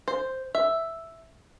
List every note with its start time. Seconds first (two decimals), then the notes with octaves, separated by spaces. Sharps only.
0.08 C5
0.55 E5